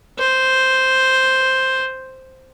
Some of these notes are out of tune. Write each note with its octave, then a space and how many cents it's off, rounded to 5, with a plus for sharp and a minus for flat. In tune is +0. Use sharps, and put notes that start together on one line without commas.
C5 +0